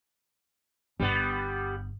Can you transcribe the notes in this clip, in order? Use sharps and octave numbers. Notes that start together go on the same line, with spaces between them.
G1 G3 B3